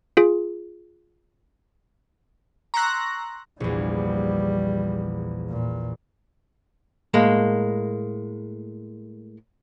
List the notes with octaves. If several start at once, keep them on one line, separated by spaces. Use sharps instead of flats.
F4 G#4
A#5 C6 C#6 E6 F#6 A#6
A#1 E2 G3
A#2
A2 G#3 A#3